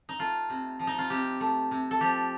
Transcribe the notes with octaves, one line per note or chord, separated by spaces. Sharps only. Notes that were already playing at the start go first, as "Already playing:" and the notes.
D#4
A3 F4
C3
F3
D#4
F4
C3 G4
A3
C3
A4
F3 G4